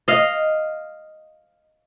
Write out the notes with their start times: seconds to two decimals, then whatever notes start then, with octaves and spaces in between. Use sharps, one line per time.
0.08 D#5 F5